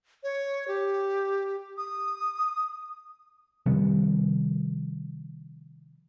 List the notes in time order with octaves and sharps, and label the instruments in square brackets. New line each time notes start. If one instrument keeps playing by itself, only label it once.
[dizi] C#5
G4
D#6
[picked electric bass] C3 D#3 F3 G3